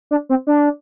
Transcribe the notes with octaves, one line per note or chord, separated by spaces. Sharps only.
D4
C4
D4